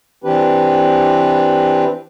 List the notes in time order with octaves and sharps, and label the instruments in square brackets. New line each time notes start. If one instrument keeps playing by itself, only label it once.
[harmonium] E3 C4 D4 G4 B4